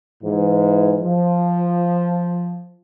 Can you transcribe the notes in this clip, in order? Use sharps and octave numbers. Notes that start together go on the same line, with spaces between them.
G#2 E3
F3